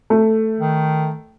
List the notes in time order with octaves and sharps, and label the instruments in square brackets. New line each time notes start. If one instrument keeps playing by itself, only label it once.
[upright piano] A3
[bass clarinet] D#3